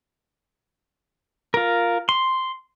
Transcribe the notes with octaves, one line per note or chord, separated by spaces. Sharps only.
F4 A#4
C6